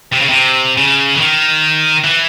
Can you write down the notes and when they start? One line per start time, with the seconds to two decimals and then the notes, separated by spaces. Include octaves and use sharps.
0.13 C3
0.21 C#3
0.29 C3
0.77 C#3
1.15 E3
1.20 D#3
2.04 E3